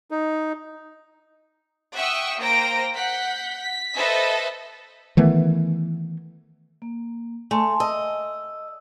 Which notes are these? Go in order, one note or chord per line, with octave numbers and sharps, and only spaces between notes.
D#4
E5 F#5 G5 C#6 D#6 E6
A#3 C5 G5 A#5 A#6 D7
F#5 G6 B6
B6
A4 B4 C5 D#5 E5
D#3 E3 A3 B3
A#3
A3 G#5 A5 C6
D#5 E6